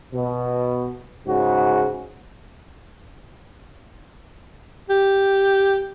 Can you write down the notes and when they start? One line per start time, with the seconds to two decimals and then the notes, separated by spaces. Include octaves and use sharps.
0.13 B2
1.27 G#2 C#3 F#4
4.90 G4